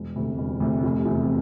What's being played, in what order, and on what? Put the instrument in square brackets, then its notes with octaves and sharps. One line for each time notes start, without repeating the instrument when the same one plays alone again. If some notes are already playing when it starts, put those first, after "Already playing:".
Already playing: [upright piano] E1
D2 C3
E1
D2 C3
F1
E2 C3